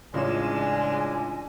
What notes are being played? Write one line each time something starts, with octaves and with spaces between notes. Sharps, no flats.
A1 C#3 G#3 D4 F4 C#5 G#5 E7